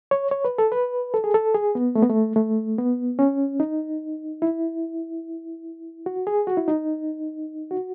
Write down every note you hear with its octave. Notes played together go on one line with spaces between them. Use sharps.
C#5
C#5
B4
A4
B4
A4
G#4
A4
G#4
B3
A3
B3
A3
A3
B3
C#4
D#4
E4
F#4
G#4
F#4
E4
D#4
F#4